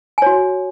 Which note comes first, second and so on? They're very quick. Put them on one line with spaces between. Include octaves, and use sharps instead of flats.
G#5 C#5 F#4